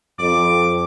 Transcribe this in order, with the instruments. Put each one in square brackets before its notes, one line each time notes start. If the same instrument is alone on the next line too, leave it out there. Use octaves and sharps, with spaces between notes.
[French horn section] F2 [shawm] D6